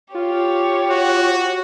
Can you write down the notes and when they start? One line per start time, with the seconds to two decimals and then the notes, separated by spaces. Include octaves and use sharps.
0.15 F4 G4 C#5
0.90 F#4